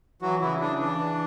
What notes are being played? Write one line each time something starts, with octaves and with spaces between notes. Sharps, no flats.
E3 F#3 F#4
C#3 E3 E4
C#3 D4
E3 D4
E3